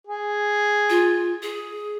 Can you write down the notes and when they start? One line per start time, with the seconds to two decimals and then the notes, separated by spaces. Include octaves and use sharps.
0.07 G#4
0.90 F4
1.43 G#4